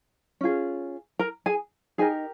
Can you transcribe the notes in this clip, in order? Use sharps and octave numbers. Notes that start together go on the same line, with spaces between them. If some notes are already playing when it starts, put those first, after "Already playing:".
C#4 F4 G#4
A#4 A#5
G#4 G#5
D#4 G4 G#4 A#4 G#5